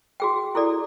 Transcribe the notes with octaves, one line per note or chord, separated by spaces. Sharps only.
F#4 G#4 G5
E4 G#4 A4 D5